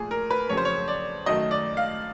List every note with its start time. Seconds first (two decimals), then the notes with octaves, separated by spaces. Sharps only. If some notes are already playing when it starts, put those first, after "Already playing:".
Already playing: A#2 F3 A3 G#4
0.11 A#4
0.30 B4
0.49 F2 C#3 F#3 C#5
0.57 C5
0.65 C#5
0.88 D5
1.26 F#2 D#3 F#3 A3 D#5
1.51 D5
1.77 F5